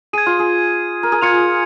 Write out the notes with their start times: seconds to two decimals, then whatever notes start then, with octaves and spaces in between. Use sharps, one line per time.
0.13 G#4 G#6 D#7
0.26 F4
0.39 G#4
1.03 A#4
1.12 G#4
1.21 F4 G#6 C#7 F7